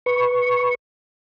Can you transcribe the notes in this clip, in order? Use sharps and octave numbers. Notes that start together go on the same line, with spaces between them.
B4 C#6